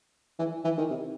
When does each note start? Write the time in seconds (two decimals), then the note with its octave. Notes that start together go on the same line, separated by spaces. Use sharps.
0.39 E3
0.64 E3
0.78 D#3
0.90 C3